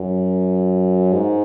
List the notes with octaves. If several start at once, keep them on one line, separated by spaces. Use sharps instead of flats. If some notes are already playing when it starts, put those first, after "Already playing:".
Already playing: F#2
G#2